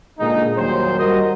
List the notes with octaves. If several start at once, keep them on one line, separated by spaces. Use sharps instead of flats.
A#2 D3 G#3 D#4
D#2 A#2 F#3 G3 C5
G3 F#4 A#4 D#5